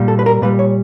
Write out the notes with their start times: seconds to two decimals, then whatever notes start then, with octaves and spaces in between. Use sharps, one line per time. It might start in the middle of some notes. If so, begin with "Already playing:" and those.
Already playing: A#2 G3
0.08 A4
0.19 B4
0.26 A#4
0.42 A#2 G3 B4
0.59 C#5